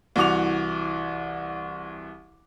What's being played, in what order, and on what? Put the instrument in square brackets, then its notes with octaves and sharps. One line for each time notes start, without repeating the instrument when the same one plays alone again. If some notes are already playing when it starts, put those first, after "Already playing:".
[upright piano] C2 E3 F#4 D6 F7